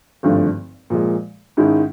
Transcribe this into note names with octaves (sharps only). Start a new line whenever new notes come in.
G#1 G2 D3 F3 A3
A#2 F3 G#3
G#2 D#3 G#3 C#4 E4